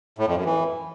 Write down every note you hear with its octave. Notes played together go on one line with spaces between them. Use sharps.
A2
F2
F#2
E3